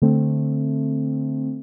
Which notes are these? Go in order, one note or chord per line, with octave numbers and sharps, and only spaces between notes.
D3 A3 C4